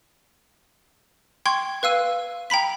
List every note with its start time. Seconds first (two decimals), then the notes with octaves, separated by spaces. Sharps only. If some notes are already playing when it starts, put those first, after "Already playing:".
1.46 G5 C6 C#6 G#6
1.83 B4 F5 E6 D#7
2.50 G5 A#5 B5 B6